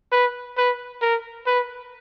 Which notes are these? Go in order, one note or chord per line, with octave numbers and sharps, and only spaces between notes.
B4
B4
A#4
B4